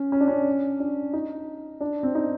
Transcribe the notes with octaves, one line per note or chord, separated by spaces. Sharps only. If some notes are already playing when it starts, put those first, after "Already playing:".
Already playing: C#4
C#4
D4
C#4
D4
D#4
D4
C4
D#4